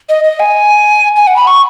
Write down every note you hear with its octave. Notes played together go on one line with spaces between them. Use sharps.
D#5
D#5
G#5
G#5
F#5
B5
C#6